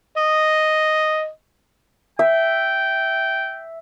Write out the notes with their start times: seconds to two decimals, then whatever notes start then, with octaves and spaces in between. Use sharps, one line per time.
0.17 D#5
2.19 E5 G5